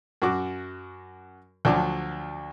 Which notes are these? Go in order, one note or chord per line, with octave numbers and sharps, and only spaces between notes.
F#2 F#4 D6
D2 F3 F#3 D4 D6